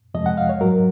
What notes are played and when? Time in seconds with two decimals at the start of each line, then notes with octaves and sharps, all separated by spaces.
0.14 F2 C3 F3 G#3 D#5
0.26 F#5
0.37 F5
0.49 C#5
0.61 G#2 F#3 A#4